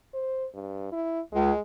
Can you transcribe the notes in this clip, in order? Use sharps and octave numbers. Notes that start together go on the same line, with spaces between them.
C5
G2
E4
C#2 G#3